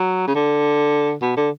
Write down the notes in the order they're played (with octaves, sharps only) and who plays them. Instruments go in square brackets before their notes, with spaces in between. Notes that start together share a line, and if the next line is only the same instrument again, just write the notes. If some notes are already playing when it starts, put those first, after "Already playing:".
Already playing: [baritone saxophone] F#3
C#3
D3
B2
D3